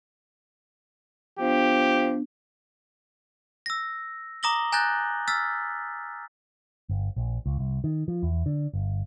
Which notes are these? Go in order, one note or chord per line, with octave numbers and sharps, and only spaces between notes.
F3 B3 D4 G4
E6 A#6
A#5 D6 D#6 A#6 F#7 G7
G#5 A#5 F#6 G6 A6 A#6
E6 F6 A6 B6
G1
A#1
C#2
C2
D#3
F3
E2
D3
G1